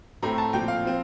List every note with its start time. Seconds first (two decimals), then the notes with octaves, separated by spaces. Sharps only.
0.22 A2 A3 C4 A#5
0.38 A5
0.53 A#2 F3 C4 G5
0.68 F5
0.85 F3 C4